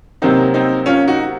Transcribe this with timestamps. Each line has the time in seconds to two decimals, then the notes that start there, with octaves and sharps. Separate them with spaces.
0.22 C3 F#3 A#3 C4 D#4
0.54 C4 D#4
0.86 C#4 F4
1.07 D#4 F#4